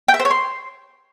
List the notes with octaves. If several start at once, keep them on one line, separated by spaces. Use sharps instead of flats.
G5
E5
C5
C#5
C6